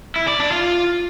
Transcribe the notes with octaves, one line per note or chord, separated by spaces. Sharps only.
E4
D5
D4
F4